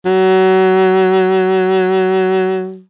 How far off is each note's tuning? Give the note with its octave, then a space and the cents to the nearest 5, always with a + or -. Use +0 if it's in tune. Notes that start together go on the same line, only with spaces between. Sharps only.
F#3 +25